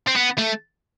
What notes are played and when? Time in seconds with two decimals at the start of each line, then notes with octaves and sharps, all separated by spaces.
0.07 C4
0.16 B3
0.38 A3